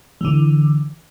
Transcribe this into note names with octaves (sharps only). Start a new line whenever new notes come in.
D3 E3